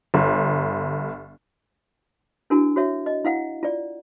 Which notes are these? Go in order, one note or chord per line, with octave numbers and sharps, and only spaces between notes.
G1
D4 E4 F#4 A#4 G#5
F#4 C#5 E5
D#5
E4 F5 F#5
F4 D5